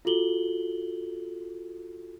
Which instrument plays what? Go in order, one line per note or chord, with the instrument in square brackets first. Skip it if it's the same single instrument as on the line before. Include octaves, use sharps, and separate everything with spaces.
[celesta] F4 F#4 A4 F#7 G7